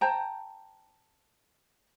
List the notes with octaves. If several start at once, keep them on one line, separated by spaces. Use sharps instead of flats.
C5 G5 A5 A#5